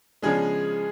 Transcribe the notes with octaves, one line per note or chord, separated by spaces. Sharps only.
C#3 F3 G#3 B3 D4 G#4